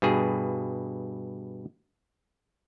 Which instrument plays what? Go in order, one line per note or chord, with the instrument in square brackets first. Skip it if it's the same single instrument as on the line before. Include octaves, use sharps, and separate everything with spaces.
[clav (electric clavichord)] G2 B2 G#4